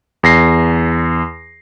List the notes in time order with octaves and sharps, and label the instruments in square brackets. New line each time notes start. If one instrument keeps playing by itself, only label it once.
[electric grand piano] E2 A#6 C7